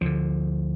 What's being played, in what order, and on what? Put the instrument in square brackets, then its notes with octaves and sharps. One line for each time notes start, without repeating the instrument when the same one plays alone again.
[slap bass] D2 D3 F3